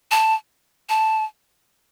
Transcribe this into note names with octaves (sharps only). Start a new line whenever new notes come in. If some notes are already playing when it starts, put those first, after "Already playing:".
A5
A5